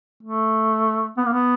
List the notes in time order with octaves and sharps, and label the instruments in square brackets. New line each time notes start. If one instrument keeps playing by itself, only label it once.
[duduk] A3
B3
A#3
B3